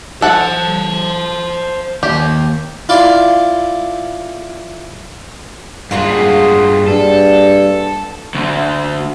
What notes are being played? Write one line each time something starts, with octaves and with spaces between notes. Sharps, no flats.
A4 C5 F#5 A5
D#2 G4
E4 F4 D5 F5
G2 A#3 F4 F#4 G#4
G2 A4
D2